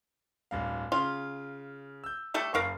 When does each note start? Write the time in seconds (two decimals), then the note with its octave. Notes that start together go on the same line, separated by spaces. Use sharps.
0.51 D1 G2 F5
0.92 C#3 F4
2.04 E6 G6
2.34 G3 A3 A4
2.54 F#1 A#4 F5 C#6